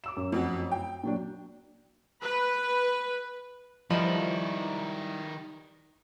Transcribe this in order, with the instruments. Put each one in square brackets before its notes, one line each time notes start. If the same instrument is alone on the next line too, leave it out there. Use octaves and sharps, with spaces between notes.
[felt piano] D6 E6 E7
F#2
[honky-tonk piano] F2 C4 F#4
G5
[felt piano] A#2 F#3 D4
[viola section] B4
[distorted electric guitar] D#3 B4 [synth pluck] F3 [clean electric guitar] G3 E4 D#5